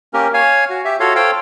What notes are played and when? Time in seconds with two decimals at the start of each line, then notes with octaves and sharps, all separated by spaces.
0.14 A#3 C#4 G4 A#4
0.34 C#5 F5 G#5
0.70 F#4
0.85 G4 E5
1.00 F4 F#4 A4 C#5 F5
1.15 A4 C5 C#5 F5 G5